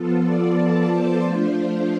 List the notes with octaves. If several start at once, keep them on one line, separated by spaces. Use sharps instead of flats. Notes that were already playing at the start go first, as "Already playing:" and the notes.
Already playing: F3 B3 F4 A4
D5
A5
C5
F3 A3 D4 F4 C5